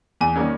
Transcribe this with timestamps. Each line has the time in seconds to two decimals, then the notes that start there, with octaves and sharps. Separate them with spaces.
0.21 E2 G#5
0.36 D#3 G3 A#3 C#4